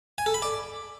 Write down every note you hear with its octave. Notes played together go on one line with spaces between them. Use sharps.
G#5
A4
B5
D5